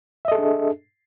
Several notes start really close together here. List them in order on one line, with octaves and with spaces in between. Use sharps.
E5 D#5 A4 G#4 D4